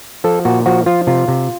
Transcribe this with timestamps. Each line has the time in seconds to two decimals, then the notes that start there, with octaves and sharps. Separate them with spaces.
0.24 F3 A4
0.45 A#2 F#4
0.66 F3 F#4
0.86 F3 F4
1.07 C3 F4
1.28 C3